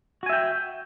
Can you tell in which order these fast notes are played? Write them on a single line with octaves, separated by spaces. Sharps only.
F#4 G#5 E5 G5